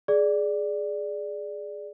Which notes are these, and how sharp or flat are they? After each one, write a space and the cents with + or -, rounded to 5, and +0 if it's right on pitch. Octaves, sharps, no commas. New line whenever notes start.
G#4 +10 D5 +0